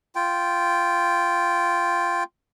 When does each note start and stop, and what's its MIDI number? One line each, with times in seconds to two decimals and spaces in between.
0.15 2.24 65
0.15 2.24 79